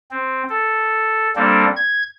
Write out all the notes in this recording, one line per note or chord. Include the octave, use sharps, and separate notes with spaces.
C4
A4
G3 A#3 C4 D4 A4
G#6